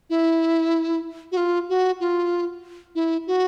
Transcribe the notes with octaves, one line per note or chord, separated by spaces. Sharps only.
E4
F#4
F4
F#4
F4
E4
F#4